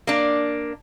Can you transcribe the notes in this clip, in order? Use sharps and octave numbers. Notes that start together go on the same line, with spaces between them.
A#3 D4